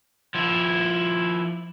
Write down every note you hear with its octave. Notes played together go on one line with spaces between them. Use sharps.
F3 E4